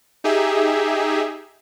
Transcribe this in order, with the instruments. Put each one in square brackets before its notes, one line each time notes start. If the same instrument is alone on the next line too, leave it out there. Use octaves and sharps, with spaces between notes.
[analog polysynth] D#4 G4 G#4 E5